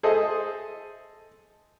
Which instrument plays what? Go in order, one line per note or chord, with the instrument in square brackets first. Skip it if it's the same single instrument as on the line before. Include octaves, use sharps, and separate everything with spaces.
[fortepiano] G#4 A4 C5 D#5 E5